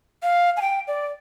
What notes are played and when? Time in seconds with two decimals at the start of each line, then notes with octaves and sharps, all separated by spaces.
0.23 F5
0.57 G#5
0.62 G5
0.88 D5